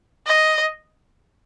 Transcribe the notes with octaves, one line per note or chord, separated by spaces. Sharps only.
D#5